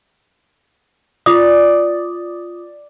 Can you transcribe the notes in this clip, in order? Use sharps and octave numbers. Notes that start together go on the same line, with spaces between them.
F4 D5 D#6